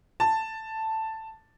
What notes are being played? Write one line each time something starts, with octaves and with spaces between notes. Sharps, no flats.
A5